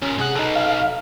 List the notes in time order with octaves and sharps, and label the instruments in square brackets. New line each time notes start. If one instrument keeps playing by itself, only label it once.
[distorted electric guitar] D#2 A#2 [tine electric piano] C#4
[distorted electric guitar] G#2 F#5 [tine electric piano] C3 G#4 F#6
[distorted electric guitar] B1 B2 [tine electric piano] D#4 A4
[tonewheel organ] F5